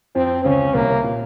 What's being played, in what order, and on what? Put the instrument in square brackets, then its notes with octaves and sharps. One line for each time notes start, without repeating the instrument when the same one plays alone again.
[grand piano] F2 F3 [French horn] C4
[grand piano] C#2 C#3 [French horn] C#4
[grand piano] C2 C3 [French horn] A#3
[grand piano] A#2